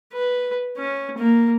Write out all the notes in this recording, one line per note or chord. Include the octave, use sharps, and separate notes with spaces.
B4
C#4
A#3